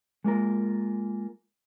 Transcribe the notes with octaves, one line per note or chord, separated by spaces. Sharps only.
G#3 A#3 F4 A#4